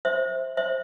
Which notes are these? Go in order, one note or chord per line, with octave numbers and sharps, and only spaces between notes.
C5 E5
C5 E5